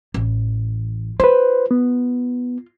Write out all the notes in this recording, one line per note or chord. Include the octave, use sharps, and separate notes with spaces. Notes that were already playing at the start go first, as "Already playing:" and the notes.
A1
F4 B4 C5
B3